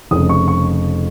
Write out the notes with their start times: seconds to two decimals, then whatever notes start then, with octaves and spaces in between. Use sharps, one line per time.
0.11 F1 F2 C#3 D#6
0.29 C#6
0.48 C#6